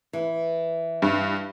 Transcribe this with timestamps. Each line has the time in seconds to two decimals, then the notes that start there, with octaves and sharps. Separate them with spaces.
0.13 E3
1.02 G2